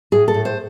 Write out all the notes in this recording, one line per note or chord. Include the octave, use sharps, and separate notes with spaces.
A2 G#4
A4
A2
C5